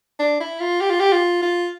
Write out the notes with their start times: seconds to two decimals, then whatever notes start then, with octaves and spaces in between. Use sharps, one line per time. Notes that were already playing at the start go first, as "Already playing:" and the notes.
0.19 D4
0.40 E4
0.60 F4
0.81 G4
0.90 F4
1.00 G4
1.12 F4
1.42 F4